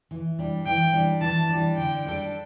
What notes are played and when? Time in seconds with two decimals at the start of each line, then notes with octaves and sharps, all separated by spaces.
0.11 E3
0.39 G3 D4
0.66 E3 G5
0.93 G3 D4
1.21 E3 A5
1.49 G3 D4
1.77 D3 G5
2.05 G3 D4 A4